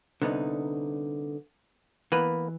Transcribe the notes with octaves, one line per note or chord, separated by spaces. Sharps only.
C2 D3 B3 D#4
E3 A#3 B3 B4